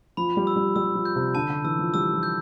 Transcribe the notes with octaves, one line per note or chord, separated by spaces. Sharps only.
F3 B5
G3
E6
G3
G3 E6
F3
G6
C3
D3 A5
D3
E3 E6
F3
G3 E6
F3
G6